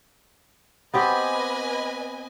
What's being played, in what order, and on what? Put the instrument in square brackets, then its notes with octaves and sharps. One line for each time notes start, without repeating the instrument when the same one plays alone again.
[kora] B3 C4 G4 [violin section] B4 D#5 G#5